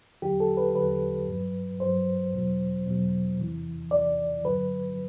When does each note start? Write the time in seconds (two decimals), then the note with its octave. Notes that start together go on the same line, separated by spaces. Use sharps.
0.22 E2 D3 F#3 G4
0.40 A4
0.57 B4
0.74 E2 D3 F#3 B4
1.27 G2
1.32 F#3
1.80 G2 F#3 C5
2.33 E2 B2 F#3
2.87 E2 B2 F#3
3.39 E2 C3 E3
3.91 E2 C3 E3 D5
4.44 G2 D3 F#3 B4